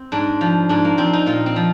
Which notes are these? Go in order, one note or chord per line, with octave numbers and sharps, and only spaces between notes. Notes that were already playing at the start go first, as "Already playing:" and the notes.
Already playing: C4
G#2 D4
F3
G#2 D4
A#3
F3 C4
D#4
A#2 F4
C4
F3